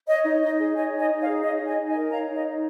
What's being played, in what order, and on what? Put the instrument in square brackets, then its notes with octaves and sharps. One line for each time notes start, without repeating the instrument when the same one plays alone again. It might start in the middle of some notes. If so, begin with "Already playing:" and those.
[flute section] C#5 D#5
D#4
D#4 D#5
G#4
C#5 D#5 G#5
D#4
D#5 G#5
D#4
C#5 F5
G#4
C#5 D#5
D#4
D#5 G#5
D#4
D#5 G#5
A#4
C#5 F5 A#5
D#4
D#5
D#4